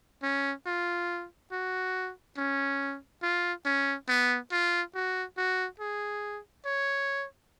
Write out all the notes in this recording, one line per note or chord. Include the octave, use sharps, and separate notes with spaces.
C#4
F4
F#4
C#4
F4
C#4
B3
F4
F#4
F#4
G#4
C#5